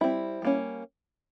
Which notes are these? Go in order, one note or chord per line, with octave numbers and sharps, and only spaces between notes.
G3 C4 E4
G3 A#3 C#4